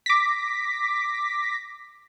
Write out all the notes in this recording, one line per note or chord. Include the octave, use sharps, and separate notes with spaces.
D6 A#6 B6